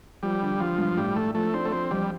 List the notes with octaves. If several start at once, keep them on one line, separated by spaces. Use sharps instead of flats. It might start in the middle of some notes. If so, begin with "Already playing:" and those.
F3 G3
D3
D3 F3
G2
A2 G3
A3 D4
F3 A3
C4 D4
A3
F3 C4
F2 G3